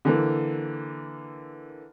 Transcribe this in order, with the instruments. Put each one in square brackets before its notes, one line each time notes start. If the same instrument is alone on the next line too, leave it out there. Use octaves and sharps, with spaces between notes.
[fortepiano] D3 E3 A#3